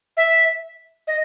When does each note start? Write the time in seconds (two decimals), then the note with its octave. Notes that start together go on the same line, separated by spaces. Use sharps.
0.17 E5
1.07 D#5